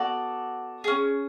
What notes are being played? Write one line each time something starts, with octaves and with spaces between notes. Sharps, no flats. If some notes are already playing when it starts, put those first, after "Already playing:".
Already playing: B3 F#4 A4 D5
C#4 G#4